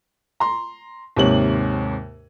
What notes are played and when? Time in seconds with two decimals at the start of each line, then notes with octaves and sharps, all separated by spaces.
0.40 A#5 C6
1.17 D#2 G#2 C3 C#5 F#7